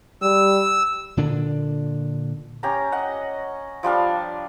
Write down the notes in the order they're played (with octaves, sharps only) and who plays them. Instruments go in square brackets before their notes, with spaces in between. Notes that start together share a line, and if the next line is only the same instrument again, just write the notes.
[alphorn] G3 [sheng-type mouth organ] E6
[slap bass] A#2 D3 D4
[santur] C#4 G4 A#5
D#5 F#5
F3 G3 D4 F5